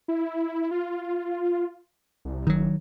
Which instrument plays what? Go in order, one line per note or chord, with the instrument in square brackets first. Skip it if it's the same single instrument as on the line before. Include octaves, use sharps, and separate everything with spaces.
[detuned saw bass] E4
F4
C2
[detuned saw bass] F#1 [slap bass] D#3 F#3